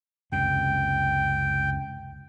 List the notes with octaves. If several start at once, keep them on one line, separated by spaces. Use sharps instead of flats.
C#2 F#2 C3 G5